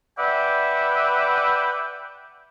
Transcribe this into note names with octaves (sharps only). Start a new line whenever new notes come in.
B4 D5 E5 F#5 G5